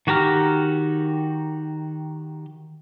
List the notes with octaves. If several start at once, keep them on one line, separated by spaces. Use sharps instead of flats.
D#3 F#4 G4 A#5 F6